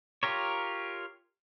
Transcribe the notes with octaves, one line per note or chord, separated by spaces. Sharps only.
F4 G4 A#4 C#5